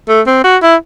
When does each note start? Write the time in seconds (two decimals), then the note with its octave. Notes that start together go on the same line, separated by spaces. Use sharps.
0.08 A3
0.27 C4
0.44 F#4
0.62 E4